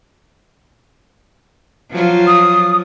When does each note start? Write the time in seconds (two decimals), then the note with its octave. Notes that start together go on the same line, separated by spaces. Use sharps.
1.91 F3 F#3 F4
2.27 D#6